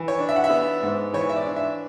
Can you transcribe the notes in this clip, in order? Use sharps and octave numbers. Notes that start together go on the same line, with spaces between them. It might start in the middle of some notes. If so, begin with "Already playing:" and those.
Already playing: E3
C#5
D4
E5
F#5
E5
B3
G#2
E3 C#5
E5
D5
D4
E5